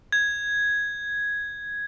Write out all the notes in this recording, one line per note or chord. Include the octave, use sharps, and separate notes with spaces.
G#6